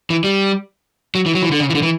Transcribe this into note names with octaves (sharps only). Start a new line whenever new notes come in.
E3
G3
F#3
E3
F#3
E3
D3
C#3
E3
D3
E3